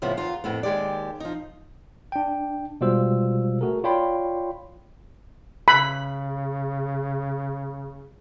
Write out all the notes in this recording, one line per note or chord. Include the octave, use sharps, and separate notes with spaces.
A2 C#3 F3 B3 E5
E2 F4 A#5
F2 A2 B3
D#2 D#3 G#3 G4 D5
F3 D#4
D4 G5
B2 G3 G#3 F4 C5 E6
A3 F#4 G#4 A#4
F4 C#5 D5 G5 B5 C6
C#3 B5